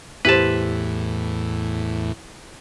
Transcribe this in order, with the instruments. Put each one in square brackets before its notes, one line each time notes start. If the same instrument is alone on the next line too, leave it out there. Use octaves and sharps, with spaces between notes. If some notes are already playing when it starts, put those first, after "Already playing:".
[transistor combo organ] E2 A2 [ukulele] E4 G4 C5 [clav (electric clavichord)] B4 A5